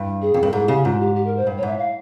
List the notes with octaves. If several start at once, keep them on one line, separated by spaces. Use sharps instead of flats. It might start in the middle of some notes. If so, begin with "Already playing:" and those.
Already playing: G2
G#4
F2
G2
A#4
G#2 G#4
C#3 G4
G#2 F4
G4
G4
A#4
C5
G2
C#5
G#2 E5
F5